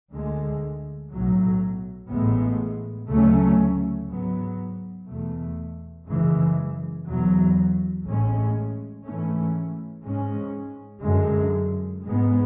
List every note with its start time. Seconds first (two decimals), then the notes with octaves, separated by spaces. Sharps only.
0.12 D2 D3 G#3
1.10 B1 A2 F#3
2.10 A1 A2 G#3 B3
3.09 D2 C#3 F#3 A3 C#4
4.08 G#2 F#3 B3
5.07 E2 B2 A3
6.07 F#2 C#3 E3 G#3
7.06 E2 B2 F#3
8.05 A1 A2 G#3 C#4
9.04 G#2 E3 A3 C#4
10.04 G#2 G#3 C#4
11.02 F#2 D3 G#3
12.02 G#2 G#3 B3